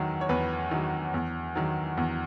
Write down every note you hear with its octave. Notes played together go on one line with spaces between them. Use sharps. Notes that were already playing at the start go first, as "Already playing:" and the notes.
Already playing: E2 D#3 F#3
C#5
E2 B4
D#3 F#3
E2
D#3 F#3
E2